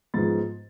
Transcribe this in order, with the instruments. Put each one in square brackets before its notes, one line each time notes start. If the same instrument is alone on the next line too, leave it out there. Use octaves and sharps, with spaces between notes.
[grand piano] G#2 F3 G#3 B3 A6